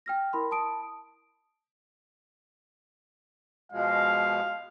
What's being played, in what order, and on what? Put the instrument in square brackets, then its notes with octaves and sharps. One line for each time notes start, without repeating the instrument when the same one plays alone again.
[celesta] G5 F6 A#6
E4 A#4 B5 C6
A5 D#6 D7
[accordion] B2 F3 G#3 [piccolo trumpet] F5